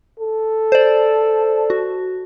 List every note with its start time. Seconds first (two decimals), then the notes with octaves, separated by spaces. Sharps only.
0.20 A4
0.72 C5 D5
1.70 F#4